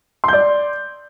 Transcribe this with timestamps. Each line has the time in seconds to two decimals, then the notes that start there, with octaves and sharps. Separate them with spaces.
0.24 C6
0.28 G6
0.33 D5